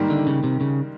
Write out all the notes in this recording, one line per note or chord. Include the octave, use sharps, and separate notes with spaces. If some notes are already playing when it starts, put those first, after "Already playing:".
Already playing: G#2 D#3 G3 A#3
D3
C#3
C3
C#3